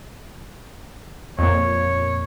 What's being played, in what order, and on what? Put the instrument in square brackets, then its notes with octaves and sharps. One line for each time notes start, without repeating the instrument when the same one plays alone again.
[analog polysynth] F2 A#2 [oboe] C#5